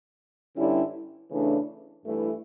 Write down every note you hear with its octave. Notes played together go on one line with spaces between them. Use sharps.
G2 D3 G3 C#4 E4
C#3 E3 A3 D4
G2 E3 A3 E4